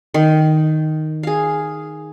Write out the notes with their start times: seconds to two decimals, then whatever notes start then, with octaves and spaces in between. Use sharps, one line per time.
0.14 D#3
1.23 G#4 F5